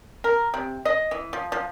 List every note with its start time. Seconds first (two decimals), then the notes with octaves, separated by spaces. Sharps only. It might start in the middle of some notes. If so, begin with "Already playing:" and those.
0.24 A#4
0.54 C3
0.85 D#5
1.11 E3
1.33 F3
1.52 F3